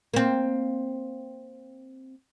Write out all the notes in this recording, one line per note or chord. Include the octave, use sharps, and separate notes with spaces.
A#3 C4